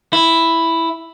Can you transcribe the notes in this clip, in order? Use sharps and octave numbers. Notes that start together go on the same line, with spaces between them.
E4